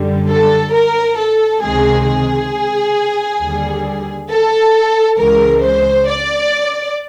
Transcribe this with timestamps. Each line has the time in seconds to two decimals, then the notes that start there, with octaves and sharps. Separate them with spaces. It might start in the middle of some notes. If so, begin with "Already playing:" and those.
Already playing: F#2 D3 G3
0.29 A4
0.74 A#4
1.18 A4
1.62 C#2 C3 D#3 G#3 G#4
2.07 G#4
3.40 D#2 D3 G3
4.29 A4
5.18 C#2 C#3 E3 G#3 A#4
5.62 C5
6.08 D5